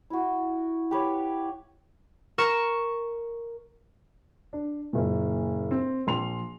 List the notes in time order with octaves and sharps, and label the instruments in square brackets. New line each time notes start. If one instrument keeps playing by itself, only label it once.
[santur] E4 F#4
G4 B4 C#5
[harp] A#4 C#6 E7
[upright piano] D4
F#1 A#2
C4
A#1 C6 F7